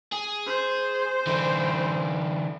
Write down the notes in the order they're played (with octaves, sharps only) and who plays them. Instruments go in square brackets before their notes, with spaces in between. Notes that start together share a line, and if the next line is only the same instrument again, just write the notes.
[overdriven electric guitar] G#4
[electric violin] C5
[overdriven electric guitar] D3 E3